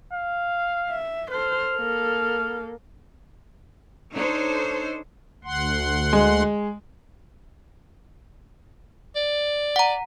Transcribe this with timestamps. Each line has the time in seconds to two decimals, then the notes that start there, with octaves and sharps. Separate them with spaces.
0.13 F5
0.90 E5
1.31 A4 C5 F6
1.73 A#3 A4
4.14 D4 D#4 A4 C5 C#5
5.44 D2 F#5 C6
6.13 G#3
9.16 D5
9.76 F#5 A#5